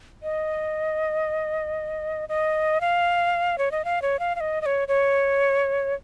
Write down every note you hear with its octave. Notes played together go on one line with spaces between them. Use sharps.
D#5
D#5
F5
C#5
D#5
F5
C#5
F5
F5
D#5
D#5
C#5
C#5